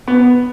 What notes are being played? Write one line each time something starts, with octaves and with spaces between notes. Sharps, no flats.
B3